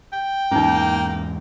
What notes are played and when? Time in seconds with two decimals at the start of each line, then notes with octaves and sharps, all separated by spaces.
0.13 G5
0.52 E2 G#2 A#3 C#4 D#4